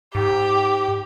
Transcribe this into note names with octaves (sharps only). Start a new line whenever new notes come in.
G#2 G4